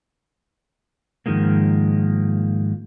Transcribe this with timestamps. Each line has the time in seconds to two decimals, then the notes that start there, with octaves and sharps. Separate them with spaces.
1.26 G#2 D#3 F3 G#3 A#3